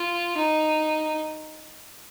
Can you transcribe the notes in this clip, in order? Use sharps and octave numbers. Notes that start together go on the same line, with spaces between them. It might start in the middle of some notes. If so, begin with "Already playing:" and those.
Already playing: F4
D#4